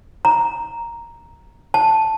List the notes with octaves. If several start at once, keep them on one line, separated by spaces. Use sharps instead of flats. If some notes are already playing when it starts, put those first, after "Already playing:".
A#5
A5